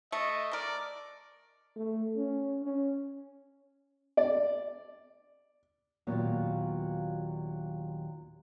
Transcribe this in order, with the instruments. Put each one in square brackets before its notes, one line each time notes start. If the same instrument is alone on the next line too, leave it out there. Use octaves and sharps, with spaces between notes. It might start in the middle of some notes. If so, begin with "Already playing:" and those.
[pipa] A3 [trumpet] D#5
[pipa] A#4 [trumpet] D5
[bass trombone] A3
C#4
C#4
[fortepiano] D5
[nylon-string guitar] D#2 A#2 F#3 B3